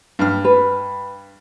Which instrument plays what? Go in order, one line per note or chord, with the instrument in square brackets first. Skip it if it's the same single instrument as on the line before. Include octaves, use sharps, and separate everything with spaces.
[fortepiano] G2 F6
[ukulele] B4